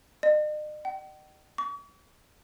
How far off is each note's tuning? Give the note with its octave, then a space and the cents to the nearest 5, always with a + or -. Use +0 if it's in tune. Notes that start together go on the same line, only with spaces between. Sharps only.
D#5 -45
G5 -45
C#6 +45